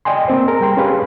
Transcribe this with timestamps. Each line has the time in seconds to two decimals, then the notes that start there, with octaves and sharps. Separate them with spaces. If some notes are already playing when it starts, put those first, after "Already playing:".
0.05 D5 D#5 G5 G#5 C6
0.28 A#3 C4 C5
0.48 G#4 A#4
0.61 G3 G5 C6
0.77 C#4 G4 G#4 B4 F5 B5